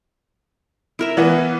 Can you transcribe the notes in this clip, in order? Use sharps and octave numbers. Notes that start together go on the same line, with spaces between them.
E4 A#4 E5
E3 B3